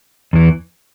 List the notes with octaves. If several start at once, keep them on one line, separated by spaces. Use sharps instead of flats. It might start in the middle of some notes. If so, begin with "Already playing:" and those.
E2 E3